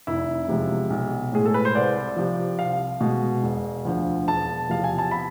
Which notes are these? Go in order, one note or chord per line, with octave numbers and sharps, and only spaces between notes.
F1 E4
E2 C3 F3 G#3
B1
A2 G#3 G#4
A4
B4
C5
C2 D5
C3 F3
C2 F5
B2 G#3
E1
D2 D3 F3
E1 A5
E2 C3 F3 F5
G#5
A5
B5